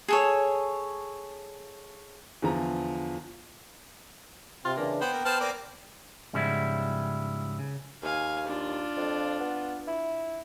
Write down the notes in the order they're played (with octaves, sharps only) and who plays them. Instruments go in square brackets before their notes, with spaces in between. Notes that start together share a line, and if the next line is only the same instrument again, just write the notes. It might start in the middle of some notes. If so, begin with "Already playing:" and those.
[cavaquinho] G#4 A4 C#5
[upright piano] E2 D3 F3 A#5
[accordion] C3 C4 [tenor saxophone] F4
[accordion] C#3 E3 D4 [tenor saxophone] A#3
[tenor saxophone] B3 [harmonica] C5 [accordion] G5
[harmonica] A#3
[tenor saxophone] B3 [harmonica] C5 A5 F6
[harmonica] A#3 C4 D5
[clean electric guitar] G#2 C#3 F3 G3 B3 E4
C#3
[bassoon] D#2 [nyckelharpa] F5 G#5
[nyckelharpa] D4 F4
[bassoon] F2
B3
E4